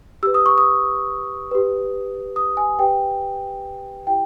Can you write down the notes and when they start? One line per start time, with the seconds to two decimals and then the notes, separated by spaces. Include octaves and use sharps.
0.23 G4 B4 E6
0.34 D#6
0.46 C#6
0.58 D#6
1.51 G4 B4
2.36 D#6
2.57 G#5
2.79 G4 B4 G5
4.07 E4 G4 G5